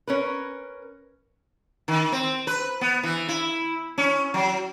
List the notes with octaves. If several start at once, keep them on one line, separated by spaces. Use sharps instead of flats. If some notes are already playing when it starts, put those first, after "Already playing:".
C#4 A#4 B4
D#3
C4
B4
B3
E3
E4
C#4
F#3